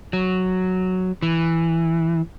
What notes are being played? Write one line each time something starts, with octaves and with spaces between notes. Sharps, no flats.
F#3
E3